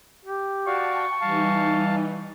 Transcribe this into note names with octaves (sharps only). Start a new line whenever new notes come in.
G4
F#4 D5 F5 G5 A5 C#6
E3 G3 D#4 F5 A5